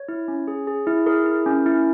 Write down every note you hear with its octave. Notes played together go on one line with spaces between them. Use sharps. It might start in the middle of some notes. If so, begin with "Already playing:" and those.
Already playing: C#5
E4
C#4
G#4
G#4
E4
G#4 A#4
E4
C#4
E4